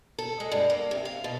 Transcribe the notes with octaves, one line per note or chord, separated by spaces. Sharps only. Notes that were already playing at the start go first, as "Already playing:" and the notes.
A4
G#3
G2
A#3
C3
F5
B2